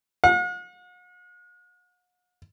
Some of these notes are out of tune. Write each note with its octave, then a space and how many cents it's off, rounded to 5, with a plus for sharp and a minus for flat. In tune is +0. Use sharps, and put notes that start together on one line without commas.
F#5 -45